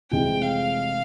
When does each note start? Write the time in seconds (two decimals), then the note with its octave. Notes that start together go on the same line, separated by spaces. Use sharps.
0.11 F1 F2 E3 G#3 C4 G5
0.42 F5